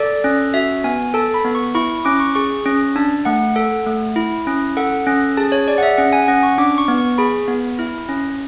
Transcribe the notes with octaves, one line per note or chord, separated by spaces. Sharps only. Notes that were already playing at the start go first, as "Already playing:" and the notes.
Already playing: A4 D5
C#4
F#4 E5
B3 G#5
A4 A5
B5
B3
C#6
E4 C#6
C#6
C#4 D6
C#6
G#4 C#6
C#4
D4 A5
A3 F#5
A4
A3
E4
C#4
A4 F#5
C#4
G#4 A5
C#5
G#4 D5
F#5
E5
C#4 F#5
G#5
C#4 F#5
C#6
D4 D6
C#6
B3
C#6
G#4 B5
B3
E4
C#4